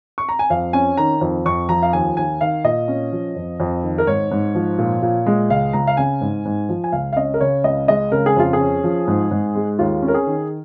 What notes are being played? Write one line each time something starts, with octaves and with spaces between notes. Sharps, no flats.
C#6
A#5
G#5
F2 F5
C#4 G#5
D#3 A#5
F2
F2 C#6
F3 A#5
F5
D#2 G#5
D#2 G#5
D#3 F5
A#2 D#5
C#4
F3
F2
F2
D#3
A#4
G#2 C#5
G#2
F3
A#2
A#2
G#3
C#2 F5
C#2 A#5
F5
C#3 G#5
G#2
G#2
F3
G#5
C#2 F5
F5
C#4 D#5
A#4
C#3 C#5
C#2 D#5
G#3 D#5
C#3 A#4
G#4
F2 F4
G#4
C#4
F3
G#2
G#2
G#3
D#2 F4
C#4
A#4
G#4
D#3